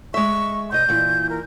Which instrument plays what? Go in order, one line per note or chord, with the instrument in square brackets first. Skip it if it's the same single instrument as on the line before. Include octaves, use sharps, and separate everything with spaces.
[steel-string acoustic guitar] G#3 E5 [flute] C#6
[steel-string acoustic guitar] C3 D#5 [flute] G6
[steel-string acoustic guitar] A#2 E3
[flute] A#4